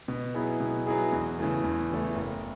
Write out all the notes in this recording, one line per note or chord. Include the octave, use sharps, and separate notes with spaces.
B2
F#3 B3 E4 G#4
B2
F#3 B3 E4 G#4
E2
C#3 E3 A3
E2
C#3 E3 A3
F#1